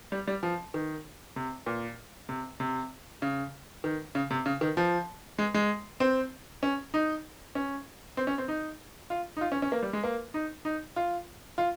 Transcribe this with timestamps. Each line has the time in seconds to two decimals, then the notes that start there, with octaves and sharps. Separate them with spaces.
0.12 G3
0.27 G3
0.43 F3
0.74 D#3
1.36 C3
1.66 A#2
2.29 C3
2.60 C3
3.22 C#3
3.84 D#3
4.15 C#3
4.31 C3
4.46 C#3
4.61 D#3
4.77 F3
5.38 G#3
5.54 G#3
6.00 C4
6.63 C#4
6.94 D#4
7.55 C#4
8.17 C4
8.27 C#4
8.38 C4
8.48 D#4
9.10 F4
9.37 D#4
9.41 F4
9.52 C#4
9.62 C#4
9.72 A#3
9.83 G3
9.93 G#3
10.04 A#3
10.34 D#4
10.65 D#4
10.96 F4
11.58 F4